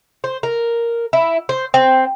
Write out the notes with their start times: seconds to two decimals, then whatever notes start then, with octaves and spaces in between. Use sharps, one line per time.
0.24 C5
0.43 A#4
1.13 E4
1.49 C5
1.74 C4